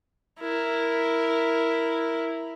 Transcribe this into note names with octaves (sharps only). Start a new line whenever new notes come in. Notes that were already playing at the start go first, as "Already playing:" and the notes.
E4 A#4